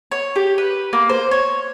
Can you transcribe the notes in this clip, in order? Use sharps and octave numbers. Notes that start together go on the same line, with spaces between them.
C#5
G4
B4
A#3
C5
C#5